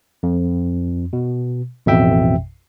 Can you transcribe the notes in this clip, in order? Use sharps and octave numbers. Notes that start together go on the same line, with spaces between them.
F2
B2
A1 F2 B2 E5 G5